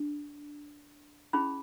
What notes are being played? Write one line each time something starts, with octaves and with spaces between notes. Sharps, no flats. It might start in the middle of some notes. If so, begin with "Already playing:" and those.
Already playing: D4
C#4 E4 G#4 B5